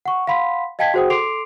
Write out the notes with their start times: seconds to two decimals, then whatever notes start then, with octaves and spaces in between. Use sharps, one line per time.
0.06 F#5 C#6
0.27 F5 F#5 B5 C6 B6
0.79 D#5 F5 G5 A5 G#6 B6
0.94 F#4 G#4 C5 F#5 G5 D#6
1.10 A4 C6 D6 C7 D7 F7